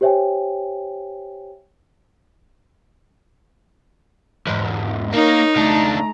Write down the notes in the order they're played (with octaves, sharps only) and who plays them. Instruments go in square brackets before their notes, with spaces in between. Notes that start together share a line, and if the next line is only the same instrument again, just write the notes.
[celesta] G4 C5 C#5 E5 G5 G#5
[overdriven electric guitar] E2 G#2
[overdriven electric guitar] A#3 [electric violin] D#4 [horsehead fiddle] A#4 C#5
[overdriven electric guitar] C#2 D4 [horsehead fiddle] A3 A#5